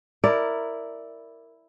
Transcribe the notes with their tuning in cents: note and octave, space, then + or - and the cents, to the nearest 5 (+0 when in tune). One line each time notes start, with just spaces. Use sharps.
E4 +0 A#4 -10 D5 +0